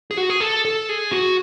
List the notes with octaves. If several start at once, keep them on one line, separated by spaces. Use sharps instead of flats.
G#4
F#4
G#4
A4
A4
G#4
F#4